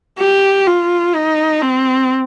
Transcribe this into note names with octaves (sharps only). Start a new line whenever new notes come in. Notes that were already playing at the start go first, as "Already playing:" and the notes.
G4
F4
D#4
C4